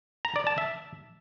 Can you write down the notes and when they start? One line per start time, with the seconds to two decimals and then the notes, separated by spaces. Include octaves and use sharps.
0.25 A#5
0.36 D5
0.47 A5
0.58 E5